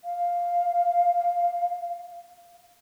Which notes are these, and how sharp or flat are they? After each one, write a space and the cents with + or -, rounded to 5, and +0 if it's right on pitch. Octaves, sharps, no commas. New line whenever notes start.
F5 +0